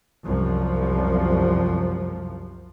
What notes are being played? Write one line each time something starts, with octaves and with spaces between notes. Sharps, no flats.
C2 F#2 F3